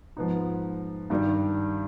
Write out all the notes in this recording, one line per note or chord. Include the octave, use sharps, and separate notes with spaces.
G#2 F3 B3 D#4
G2 D#3 G3